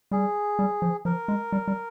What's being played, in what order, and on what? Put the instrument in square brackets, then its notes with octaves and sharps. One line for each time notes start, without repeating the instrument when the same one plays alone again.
[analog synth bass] G3 [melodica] G#4
[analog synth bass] G3
F3
[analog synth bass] F3 [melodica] A#4
[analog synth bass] G#3
G3
G3